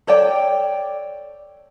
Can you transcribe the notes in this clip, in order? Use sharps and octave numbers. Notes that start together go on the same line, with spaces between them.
A4 C#5 D5 G5